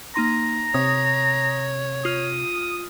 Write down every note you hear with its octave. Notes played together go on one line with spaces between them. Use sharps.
A#3 D#4 A#5 C6
C3 C#5 D#6
F4 D#6 F6